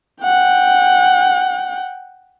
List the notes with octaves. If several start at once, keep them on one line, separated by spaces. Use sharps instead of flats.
F#5 G5